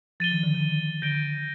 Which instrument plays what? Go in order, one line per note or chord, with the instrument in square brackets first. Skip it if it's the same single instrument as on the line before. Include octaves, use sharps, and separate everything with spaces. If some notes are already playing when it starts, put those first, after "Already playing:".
[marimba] F3 [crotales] A6 D#7 G7
[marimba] D#3
D3
D#3
[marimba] D3 [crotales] G6 A#6 D7 G7